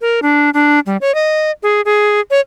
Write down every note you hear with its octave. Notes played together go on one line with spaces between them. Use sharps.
A#4
D4
D4
G3
C#5
D#5
G#4
G#4
C#5